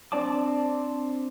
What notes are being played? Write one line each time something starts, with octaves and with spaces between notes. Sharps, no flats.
C4 D4 D5 A5 D6